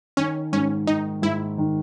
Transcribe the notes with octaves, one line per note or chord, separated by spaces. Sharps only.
D#3 C#4
G#2 C#4
D#3 D#4
G#2 E4
D#3